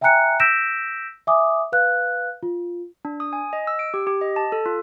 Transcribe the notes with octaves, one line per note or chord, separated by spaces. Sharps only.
E5 G5 G#5 A#5 F#6 C#7
E6 G6 A#6 B6 D7 E7
E5 G#5 D6 D#6
B4 F5 F#6
F4
D4
D#6
G#5
D#5
E6
D7
G4
G4
D#5
A5
A4
F4